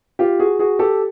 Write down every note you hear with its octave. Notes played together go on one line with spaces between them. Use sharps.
F4 G4
F#4 G#4
F#4 G#4
G4 A4